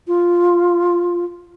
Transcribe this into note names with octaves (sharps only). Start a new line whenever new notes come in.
F4